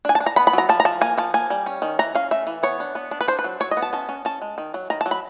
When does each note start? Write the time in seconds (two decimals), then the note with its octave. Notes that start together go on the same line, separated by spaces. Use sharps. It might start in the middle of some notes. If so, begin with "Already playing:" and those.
0.05 D4 G#5
0.15 A5
0.20 D4
0.26 A#5
0.36 B3 B5
0.47 B5
0.53 F#3 A#5
0.69 F3 A5
0.80 A#5
0.85 F3 A5
1.01 A#3 G#5
1.18 F3 A5
1.34 A#3 G#5
1.50 G3
1.66 C#4
1.82 D#3
1.99 E3 A#5
2.15 C#4 F5
2.31 A3 E5
2.47 E3
2.63 B3 C#5
2.80 D4
2.95 B3
3.11 D4
3.21 B4
3.28 D4 C5
3.39 B4
3.44 F#3
3.60 F#3 C#5
3.71 D#5
3.77 B3
3.82 A5
3.93 C#4 A5
4.09 C#4
4.25 C#4 A5
4.42 G#3
4.58 D#3
4.74 F#3
4.90 D#3 A#5
5.01 A5
5.06 F#3
5.11 B5